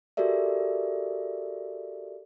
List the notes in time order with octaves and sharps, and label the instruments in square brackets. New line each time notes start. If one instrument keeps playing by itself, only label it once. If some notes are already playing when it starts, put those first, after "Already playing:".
[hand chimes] F#4 G4 A4 A#4 D5 E5